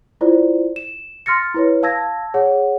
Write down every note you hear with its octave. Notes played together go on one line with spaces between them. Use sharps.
E4 F4 C5 D5
E7
C6 F6 A6 A#6 C#7
E4 B4 C#5
F5 A5 E6 G#6 A#6
G#4 C#5 F#5